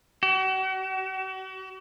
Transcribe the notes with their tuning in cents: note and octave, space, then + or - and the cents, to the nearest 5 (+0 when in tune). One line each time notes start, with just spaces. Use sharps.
F#4 +40